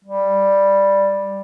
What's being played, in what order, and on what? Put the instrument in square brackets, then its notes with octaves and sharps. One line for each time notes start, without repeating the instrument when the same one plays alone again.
[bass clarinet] G3